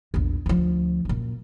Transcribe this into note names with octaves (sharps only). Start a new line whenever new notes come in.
A#1 E2
D2 F3
F#2 A#2